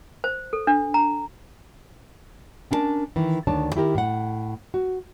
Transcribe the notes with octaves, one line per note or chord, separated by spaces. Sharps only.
C5
A4
D4
A#5
C#4 D4 E4 A#4 A5
D#3 E3
D2 D#3 D4 C#5 A5
D#3 E4 G4 A#4
A2 F#5
F#4